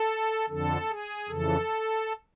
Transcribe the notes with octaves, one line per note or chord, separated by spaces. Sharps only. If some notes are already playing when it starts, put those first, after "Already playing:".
Already playing: A4
F2 D3 A4
G#4
F2 C#3 E3 A4